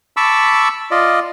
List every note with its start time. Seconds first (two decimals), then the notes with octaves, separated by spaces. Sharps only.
0.17 A5 B5 C#6 D6 E6
0.91 F4 D5 D#5